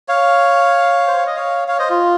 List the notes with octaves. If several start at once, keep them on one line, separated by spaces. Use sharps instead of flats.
C#5 F5
C5
C#5
D#5
C#5 F5
C#5 F5
C5 D#5
F4